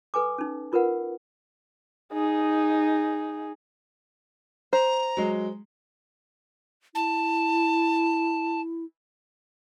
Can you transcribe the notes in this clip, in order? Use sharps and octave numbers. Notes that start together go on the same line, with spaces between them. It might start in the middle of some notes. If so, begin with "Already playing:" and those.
A4 B4 G#5 D6
C#4 D#4
D#4 F4 A#4 B4 F#5
D#4 G#4
C5 A#5
F#3 G#3
E4 A5